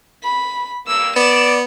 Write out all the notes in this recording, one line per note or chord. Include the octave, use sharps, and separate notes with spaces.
B5
G2 A#3 E6
B3 D5 E7